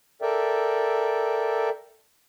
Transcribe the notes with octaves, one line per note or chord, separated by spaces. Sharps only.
A4 A#4 D5 E5 G5